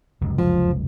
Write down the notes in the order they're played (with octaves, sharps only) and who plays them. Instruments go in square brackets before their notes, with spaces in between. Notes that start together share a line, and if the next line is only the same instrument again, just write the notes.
[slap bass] F1 C#2 F#2
[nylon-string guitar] F3